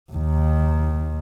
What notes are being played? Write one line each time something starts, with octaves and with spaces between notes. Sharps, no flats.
D#2 D#3